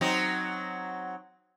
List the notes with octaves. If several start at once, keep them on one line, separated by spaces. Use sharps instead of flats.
F#3 C4 D#4